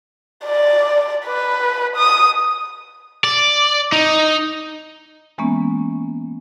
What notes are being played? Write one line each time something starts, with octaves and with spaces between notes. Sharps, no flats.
D5
B4
D#6
D5
D#4
E3 G#3 A#3 B3 C#4